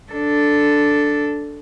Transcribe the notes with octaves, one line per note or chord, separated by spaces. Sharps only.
D4 A4